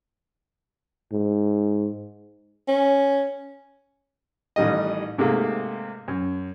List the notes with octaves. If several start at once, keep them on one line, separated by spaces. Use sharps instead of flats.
G#2
C#4
A1 D#3 G3 D#5
G#2 C3 A3 A#3 G#4
F#2